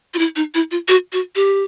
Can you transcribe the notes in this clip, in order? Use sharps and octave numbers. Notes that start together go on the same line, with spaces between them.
F4
E4
D#4
E4
F4
F#4
F#4
G4